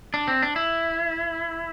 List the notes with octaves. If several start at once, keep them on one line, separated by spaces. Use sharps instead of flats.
D4
C4
D4
E4